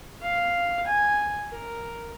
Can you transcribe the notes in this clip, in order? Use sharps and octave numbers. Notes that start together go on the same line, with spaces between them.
F5
G#5
A#4